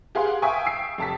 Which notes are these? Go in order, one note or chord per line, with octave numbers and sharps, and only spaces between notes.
G4 G#4 F5 F#5 C6
E5 F5 G5 G#5 C#6 D#6
E6 C7 D7
F1 A5 B6